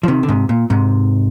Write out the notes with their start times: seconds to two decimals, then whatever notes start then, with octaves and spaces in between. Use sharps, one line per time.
0.03 F3
0.08 C3 D#3
0.23 D3
0.29 G#2 C3
0.49 A#2
0.70 G#2 C3